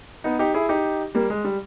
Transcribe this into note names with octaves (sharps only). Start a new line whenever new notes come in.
B3 D#4
D#4 G4
E4 G#4
D#4 G4
G3 A#3
G#3
G3